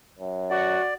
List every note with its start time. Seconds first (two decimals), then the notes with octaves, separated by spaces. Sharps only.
0.18 F#2
0.50 F#4 D5